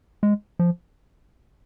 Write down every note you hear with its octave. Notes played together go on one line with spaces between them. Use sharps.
G#3
F3